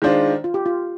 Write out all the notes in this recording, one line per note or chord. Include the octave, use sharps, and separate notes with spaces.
D#3 G#3 D4 F4 C5
F4
G4
F4